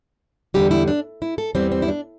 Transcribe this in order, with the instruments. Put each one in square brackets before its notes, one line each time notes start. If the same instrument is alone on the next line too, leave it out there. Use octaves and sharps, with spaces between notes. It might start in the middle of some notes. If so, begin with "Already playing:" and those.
[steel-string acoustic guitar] E2 D3 G3 G4
E4
D4
E4
A4
E2 E3 G3 C4
C4
E4
D4